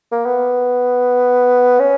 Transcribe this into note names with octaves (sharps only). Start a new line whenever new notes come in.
A#3
B3
C#4